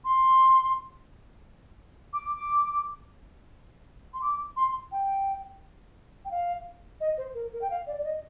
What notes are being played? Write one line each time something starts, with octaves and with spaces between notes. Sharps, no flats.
C6
D6
C6
D6
C6
G5
G5
F5
D#5
C5
A#4
A#4
G5
F5
D5
D5
D#5